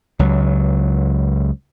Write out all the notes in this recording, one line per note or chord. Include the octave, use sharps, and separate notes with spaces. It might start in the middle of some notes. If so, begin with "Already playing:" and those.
C#2 F#3